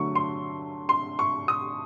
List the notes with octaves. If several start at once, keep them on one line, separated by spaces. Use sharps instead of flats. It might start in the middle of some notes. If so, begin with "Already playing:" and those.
Already playing: D3 F#3 A3 C#6
C6
C6
C#6
D#6